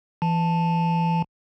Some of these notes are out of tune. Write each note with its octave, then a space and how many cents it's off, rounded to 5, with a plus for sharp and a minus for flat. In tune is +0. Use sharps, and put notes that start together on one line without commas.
E3 +25 A5 +0